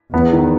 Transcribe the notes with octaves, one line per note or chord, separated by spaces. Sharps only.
E2 B3
D#3